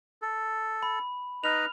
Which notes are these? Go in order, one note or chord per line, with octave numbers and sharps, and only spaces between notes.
A4
B5
D#4 B4 D#5 F6 F7